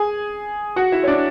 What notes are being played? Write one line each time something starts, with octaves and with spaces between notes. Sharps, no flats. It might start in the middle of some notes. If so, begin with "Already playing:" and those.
Already playing: G#4 G#5
F#4 F#5
E4 E5
C#5
D4 D5